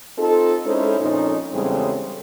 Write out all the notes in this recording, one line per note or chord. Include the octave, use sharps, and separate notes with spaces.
C4 D#4 F4 A4
G#3 C#4 D#4 E4 A4 C5
F2 A#2 C#4 D#4
E2 C#3 G3 G#3 C4 A4